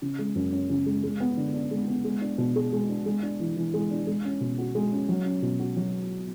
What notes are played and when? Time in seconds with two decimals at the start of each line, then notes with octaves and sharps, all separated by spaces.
0.02 C#3
0.19 G#3
0.35 F#2
0.52 C#4
0.70 C#3
0.86 G#3
1.03 G#3
1.20 B3
1.37 D3
1.54 D4
1.71 G#3
1.88 B3
2.05 G#3
2.21 D4
2.38 B2
2.56 G#4
2.73 G#3
2.89 D4
3.06 G#3
3.23 D4
3.40 E3
3.57 E3
3.74 G#3
3.91 D4
4.07 G#3
4.25 C#4
4.41 B2
4.58 F#4
4.75 G#3
4.92 C#4
5.09 F#3
5.25 C#4
5.42 B2
5.59 F#4
5.77 F#3